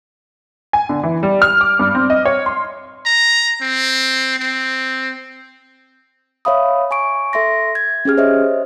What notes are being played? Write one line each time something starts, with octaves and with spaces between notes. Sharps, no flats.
G#5
D3
E3
G3
F6
D6
G2
C4
D#5
C#5
C6
A#5
C4
C4
C#5 E5 F5 B5 D#6
G#5 C#6 D7
A4 E5 C6 A#6
G#6
C#4 G4 G#4 F6
C5 C#5 D#5 E5